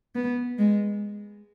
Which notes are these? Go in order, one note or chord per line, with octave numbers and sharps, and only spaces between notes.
B3
G#3